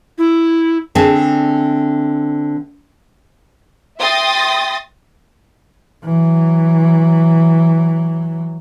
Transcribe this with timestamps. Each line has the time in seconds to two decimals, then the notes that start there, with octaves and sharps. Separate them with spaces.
0.18 E4
0.95 D3 C4 G#4 E5 A5
3.98 E5 G5 C6 D#6 A6 A#6
6.05 E3 F#3